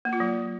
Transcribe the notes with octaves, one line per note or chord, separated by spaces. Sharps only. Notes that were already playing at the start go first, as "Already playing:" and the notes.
A#3
F4
F#3